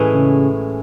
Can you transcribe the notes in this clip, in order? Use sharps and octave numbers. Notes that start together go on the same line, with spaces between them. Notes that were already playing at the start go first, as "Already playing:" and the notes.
Already playing: A2 E3 G#3 C#4
C#3